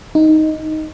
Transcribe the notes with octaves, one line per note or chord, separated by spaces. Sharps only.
D#4